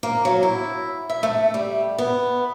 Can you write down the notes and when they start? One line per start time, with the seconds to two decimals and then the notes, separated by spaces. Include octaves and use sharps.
0.03 A#3
0.25 F#3
0.43 E4
1.10 E5
1.23 A3
1.54 G3
1.98 B3